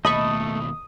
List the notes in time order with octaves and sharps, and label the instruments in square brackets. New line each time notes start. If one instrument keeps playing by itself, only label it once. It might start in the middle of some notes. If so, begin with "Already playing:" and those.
[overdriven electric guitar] D#2 B2 [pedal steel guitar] A3 A4 [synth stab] D#5 B5 C#6 [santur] D#6